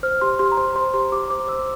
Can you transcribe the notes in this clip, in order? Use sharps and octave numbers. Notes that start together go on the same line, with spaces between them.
C5 F6
G4 C6
G4 C6
A#5
C5 C6
C5 C6
G4 C6
G4 D6
C5 D6
C5 E6